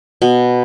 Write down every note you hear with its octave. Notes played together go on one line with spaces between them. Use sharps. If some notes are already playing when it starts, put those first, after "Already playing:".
B2